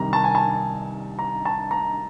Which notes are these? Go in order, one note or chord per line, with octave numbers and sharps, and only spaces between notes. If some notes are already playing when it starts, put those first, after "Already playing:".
Already playing: C2 C3 D#3 G3 A#5
A5
G#5
A5
A#5
A5
A#5